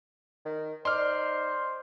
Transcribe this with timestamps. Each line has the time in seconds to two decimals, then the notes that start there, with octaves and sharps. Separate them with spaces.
0.46 D#3
0.85 D#4 C5 D5 C6 F6